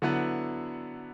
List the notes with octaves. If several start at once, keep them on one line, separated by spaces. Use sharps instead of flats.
D3 F#3 B3 E4 B4